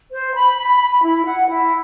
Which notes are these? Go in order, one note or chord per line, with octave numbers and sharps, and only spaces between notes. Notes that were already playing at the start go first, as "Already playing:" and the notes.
C5
B5
B5
B5
E4
F#5
E4